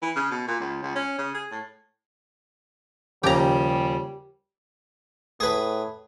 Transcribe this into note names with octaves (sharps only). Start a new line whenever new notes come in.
E3
C#3
B2
A#2
C#2
C#2
C#4
C#3
G#4
A2
D#2 C#3 F3 G3 G4 A#5
A2 G#4 B4